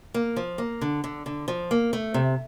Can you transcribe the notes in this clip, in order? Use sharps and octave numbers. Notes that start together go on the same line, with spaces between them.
A#3
F3
A#3
D3
D3
D3
F3
A#3
A3
C3